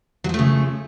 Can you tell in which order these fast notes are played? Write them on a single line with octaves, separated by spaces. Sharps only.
F#3 F3 A3 C#3